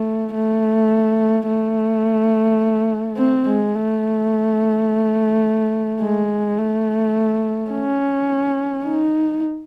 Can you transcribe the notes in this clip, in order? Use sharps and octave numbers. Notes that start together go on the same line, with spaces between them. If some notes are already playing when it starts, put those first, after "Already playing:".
Already playing: A3
A3
A3
C4
G#3
A3
G#3
A3
C#4
D#4